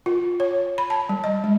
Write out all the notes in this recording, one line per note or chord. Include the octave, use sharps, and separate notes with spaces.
F4
C#5
B5
A5
G3
D#5
G#3